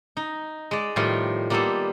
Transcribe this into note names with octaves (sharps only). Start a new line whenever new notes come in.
D#4
G#3 D5
A2 D#3 F3 G3 F4
G3 A#3 B3 G4 A4 C5